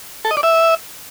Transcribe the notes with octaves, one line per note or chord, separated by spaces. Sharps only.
A4
D#5
D5
E5